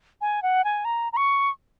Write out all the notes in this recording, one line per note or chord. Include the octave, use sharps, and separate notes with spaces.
G#5
F#5
G#5
A#5
A#5
C#6